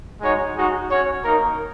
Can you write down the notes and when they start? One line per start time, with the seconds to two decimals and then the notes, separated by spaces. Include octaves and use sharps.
0.21 G#3 D#4 F#4 C#5
0.55 G#3 D#4 F#4
0.90 C#4 F#4 C#5
1.24 A#3 D#4 A#4